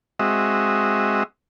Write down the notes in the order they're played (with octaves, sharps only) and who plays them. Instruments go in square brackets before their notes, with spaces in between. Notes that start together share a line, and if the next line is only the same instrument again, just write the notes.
[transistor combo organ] G#3 C4 F#4 D#5 E5